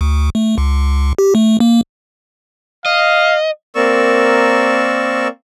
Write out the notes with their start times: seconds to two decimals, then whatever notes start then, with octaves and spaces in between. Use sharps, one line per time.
0.01 D2
0.35 A3
0.58 C#2
1.18 G4
1.35 A3
1.60 A#3
2.86 D#5 F5
3.75 A#3 C4 A#4 D5 C#6 E6